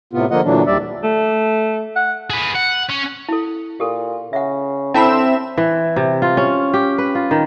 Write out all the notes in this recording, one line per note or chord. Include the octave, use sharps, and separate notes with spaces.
A2 C3 B3 F4
D3 F3 A#3 F4 D#5 F#5
A#2 D3 E3 F#3 D4
D#2 G3 D5 E5
A3
F#5
G#4 B4
F#5
C#4
E4 A4
A#2 G4 A4
C#3 E5 F#5
D3 C4 E4 E5 A5 B5 E7
E3
C3
F4
C#4
G4
B4
F4
D#3